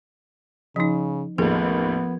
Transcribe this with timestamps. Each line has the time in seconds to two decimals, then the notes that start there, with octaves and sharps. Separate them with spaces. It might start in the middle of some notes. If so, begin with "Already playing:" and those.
0.76 C#3 F3 D#4
1.38 A1 D#2 F3 B3 G#4